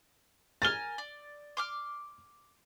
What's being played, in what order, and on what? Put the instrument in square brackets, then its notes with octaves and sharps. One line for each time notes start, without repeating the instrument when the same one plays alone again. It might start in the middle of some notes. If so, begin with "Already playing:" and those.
[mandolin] A#4 G#5 F6 [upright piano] A6 G7
[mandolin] D5
C6 D6 F6